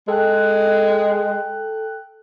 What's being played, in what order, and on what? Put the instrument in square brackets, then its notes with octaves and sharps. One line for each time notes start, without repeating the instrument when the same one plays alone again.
[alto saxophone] G#3 [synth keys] A4 G5 F#6